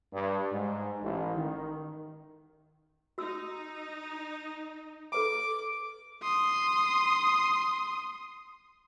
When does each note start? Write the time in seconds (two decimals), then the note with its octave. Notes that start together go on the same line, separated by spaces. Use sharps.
0.12 G2
0.51 G#2
1.02 A1
1.35 D#3
3.18 D#4 F#4 E6
5.12 A4 B4 A#5 D6
6.23 C6 D#6